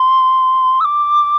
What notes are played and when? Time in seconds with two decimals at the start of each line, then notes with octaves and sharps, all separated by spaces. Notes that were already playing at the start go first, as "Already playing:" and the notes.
Already playing: C6
0.80 E6
0.85 D6